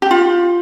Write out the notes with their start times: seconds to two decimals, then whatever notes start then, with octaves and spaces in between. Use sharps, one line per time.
0.02 G4
0.11 F4